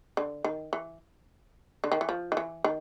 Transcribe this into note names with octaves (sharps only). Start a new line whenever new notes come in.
D3
D#3
E3
D3
D#3
E3
F3
D#3
E3
D#3